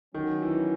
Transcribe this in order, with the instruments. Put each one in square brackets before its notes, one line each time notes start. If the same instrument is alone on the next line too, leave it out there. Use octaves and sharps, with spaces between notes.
[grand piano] D#3 [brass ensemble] F#3 C#4 F#4
[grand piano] E3